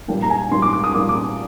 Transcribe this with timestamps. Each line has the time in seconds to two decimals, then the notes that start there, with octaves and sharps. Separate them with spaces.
0.08 A#2 G3 A#3 G5
0.22 A#5
0.30 G#5
0.51 A#2 G3 A#3 C6
0.62 D6
0.73 D6
0.84 D#6
0.95 A#2 G3 A#3 D6
1.09 D6